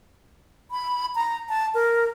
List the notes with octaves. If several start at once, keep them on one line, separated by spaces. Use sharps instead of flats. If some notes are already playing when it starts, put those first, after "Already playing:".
B5
A#5
A5
A#4